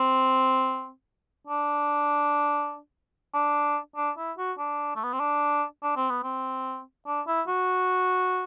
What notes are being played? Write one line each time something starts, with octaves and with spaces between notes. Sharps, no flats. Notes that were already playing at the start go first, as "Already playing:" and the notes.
Already playing: C4
D4
D4
D4
E4
F#4
D4
A3
B3
C4
D4
D4
C4
B3
C4
D4
E4
F#4